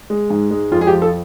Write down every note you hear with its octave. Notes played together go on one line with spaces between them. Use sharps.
G#3
G#2
G#3
F2 F4
G#4
G4
F3
A4